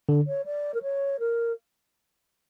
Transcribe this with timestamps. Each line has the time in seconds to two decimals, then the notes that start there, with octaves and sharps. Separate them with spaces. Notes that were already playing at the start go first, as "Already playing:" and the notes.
0.09 D3
0.27 C#5
0.45 D5
0.74 A#4
0.82 C#5
1.19 A#4